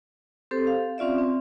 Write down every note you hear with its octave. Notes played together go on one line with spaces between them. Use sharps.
C4 G4 A4 C5
F5
C4 C#4 F4 D5 E5
C4